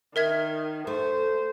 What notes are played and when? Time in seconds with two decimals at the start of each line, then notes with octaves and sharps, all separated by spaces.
0.16 D#3 A#4 E5 G#6
0.87 A3 C5